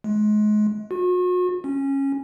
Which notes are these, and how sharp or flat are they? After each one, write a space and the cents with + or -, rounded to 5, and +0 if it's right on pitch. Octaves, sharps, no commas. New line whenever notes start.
G#3 +30
F#4 -40
C#4 -15